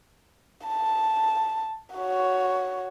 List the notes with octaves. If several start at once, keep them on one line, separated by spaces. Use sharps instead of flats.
A5
F#4 C#5